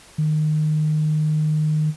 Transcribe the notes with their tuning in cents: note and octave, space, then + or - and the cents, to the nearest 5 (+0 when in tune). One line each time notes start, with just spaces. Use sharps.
D#3 -20